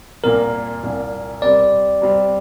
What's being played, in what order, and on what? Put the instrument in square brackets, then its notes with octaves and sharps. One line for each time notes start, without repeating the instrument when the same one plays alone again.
[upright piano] C2 A#2 A#3 [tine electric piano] A#4
[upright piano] C2 A#2 A#3
[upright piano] C3 G3 C4 [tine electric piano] D5
[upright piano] C3 G3 C4